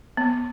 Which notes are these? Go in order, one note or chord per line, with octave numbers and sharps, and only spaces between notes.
B3